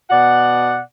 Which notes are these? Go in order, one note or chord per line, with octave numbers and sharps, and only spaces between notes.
B2 D5 F#5